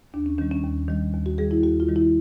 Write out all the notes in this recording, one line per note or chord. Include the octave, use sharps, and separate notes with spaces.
D#2 D4
C#4
D#3 G3 C#4
C#4
D#2
D#3 G3
D#2
F#4
D#3 G3 G#4
E4
D#2 F#4
F4
D#3 G3
E4